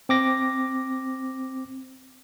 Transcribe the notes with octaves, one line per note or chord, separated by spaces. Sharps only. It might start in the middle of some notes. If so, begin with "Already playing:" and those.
C4 D6 A#6